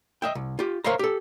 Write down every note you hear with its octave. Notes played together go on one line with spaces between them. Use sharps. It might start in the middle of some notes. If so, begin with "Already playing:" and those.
D#5 E5 G5
C2
F4 G4
A#4 C5 C#5 E5 F5 A#5
G4 A4